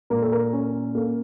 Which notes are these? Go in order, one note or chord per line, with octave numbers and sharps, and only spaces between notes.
A#2 A#4
A4
A#4
C#4
A#3 A4